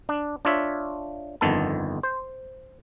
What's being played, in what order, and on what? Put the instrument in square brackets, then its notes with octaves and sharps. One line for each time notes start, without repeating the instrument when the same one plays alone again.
[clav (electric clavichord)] D4
D4 F4 C#5 E5
G1 F2 D#3 B3 A4 A5
C5